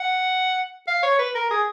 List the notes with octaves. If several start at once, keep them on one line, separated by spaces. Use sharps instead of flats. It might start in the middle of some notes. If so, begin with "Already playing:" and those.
Already playing: F#5
F5
C#5
B4
A#4
G#4